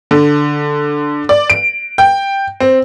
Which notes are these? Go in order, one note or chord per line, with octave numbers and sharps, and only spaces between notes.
D3
D5
D7
G5
C4